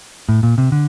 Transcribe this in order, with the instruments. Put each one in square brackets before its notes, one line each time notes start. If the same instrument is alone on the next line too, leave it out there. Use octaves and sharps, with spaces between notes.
[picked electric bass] A2
A#2
C3
D3